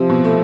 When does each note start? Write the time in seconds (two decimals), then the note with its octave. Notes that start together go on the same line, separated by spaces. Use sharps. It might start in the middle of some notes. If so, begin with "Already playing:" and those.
Already playing: C3 F3
0.09 B2
0.24 A3